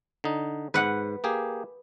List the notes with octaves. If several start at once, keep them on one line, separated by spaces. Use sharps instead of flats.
D3 D#4
G#2 B4 F#5
A#3 G4 G#4